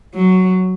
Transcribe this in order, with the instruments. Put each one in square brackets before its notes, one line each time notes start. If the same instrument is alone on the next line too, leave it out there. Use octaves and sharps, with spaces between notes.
[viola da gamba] F#3